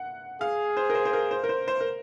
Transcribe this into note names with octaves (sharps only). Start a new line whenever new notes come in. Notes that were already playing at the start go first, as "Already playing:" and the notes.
Already playing: F#5
G#4 F5
C5
A#4
C5
C5
A#4
C5
A#4
C5
C5
A#4